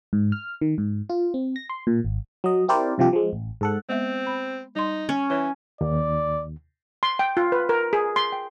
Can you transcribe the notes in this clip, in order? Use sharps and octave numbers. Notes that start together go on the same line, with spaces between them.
G#2
F6
D#3
G#2
F4
C4
A#6
C6
A#2
G#1
F#3 D#5
C4 E4 G4 A#4 C5 D5
G2 C3 F3 G4
F3 G#3
A1
G#2 A4 F#5
G#3 B3 C4 E5
B5
G3 D#4 C6
C#4
E3 C#5
D#2 D5
C6
G5
F4
B4
A#4
G#4
C6
G5